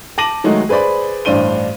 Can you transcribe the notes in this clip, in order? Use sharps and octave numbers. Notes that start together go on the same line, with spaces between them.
A5 D6 A#6 D#7 F#7
D#3 F#3 G#3 A3 D#4 F#4
G#4 B4 C5 D5 B5
A1 G2 D4 C5 D#7 G7